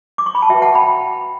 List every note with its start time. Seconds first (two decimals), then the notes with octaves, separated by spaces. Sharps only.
0.18 D6
0.26 C#6
0.35 B5
0.42 A5
0.49 F#4 B4 E5 G5
0.62 F#5 A5
0.75 G5 B5